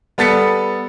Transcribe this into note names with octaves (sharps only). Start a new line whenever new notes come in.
G3 B3 A4 A6 B6 C#7